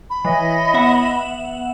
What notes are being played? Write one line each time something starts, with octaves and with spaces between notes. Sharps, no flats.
B5
E3 E4 C#5 D#5
B3 E5 F#5